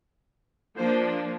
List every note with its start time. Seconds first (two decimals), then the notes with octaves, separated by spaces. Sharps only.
0.77 F3 A#3 D4 C5